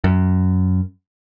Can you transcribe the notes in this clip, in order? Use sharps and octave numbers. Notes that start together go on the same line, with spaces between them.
F#2